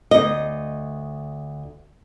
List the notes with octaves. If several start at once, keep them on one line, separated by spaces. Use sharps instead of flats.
D2 D#5